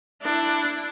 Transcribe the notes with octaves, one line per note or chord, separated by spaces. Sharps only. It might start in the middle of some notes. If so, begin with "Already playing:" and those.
D4 E4